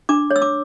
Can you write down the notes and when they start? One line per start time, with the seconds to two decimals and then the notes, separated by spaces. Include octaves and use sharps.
0.09 D4 D6
0.31 C#5
0.36 E6
0.42 D6